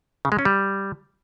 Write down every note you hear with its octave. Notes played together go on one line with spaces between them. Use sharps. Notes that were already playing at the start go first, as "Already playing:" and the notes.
C#3
G#3
C#4
G3